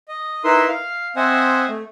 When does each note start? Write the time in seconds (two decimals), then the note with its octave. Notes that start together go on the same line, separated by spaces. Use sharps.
0.08 D#5
0.44 D#4 E4 A#4 B4 E5 C6
0.68 F5
1.16 C4 C5 D#5 E5 F#5 G#5
1.69 A3